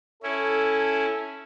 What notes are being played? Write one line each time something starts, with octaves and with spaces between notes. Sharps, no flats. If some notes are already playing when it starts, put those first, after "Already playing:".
C#4 E4 A4